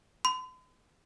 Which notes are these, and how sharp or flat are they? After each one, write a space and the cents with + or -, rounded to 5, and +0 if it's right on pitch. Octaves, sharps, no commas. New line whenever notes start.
C6 -45